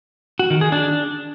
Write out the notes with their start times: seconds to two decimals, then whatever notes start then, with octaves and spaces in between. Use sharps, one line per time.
0.39 F#4
0.50 D#3
0.61 G#4
0.72 D4